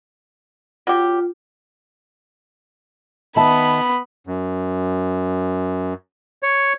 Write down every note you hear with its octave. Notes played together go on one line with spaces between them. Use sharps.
F#3 F4 G4
D#3 B3 E5 A5 B5
F#2
C#5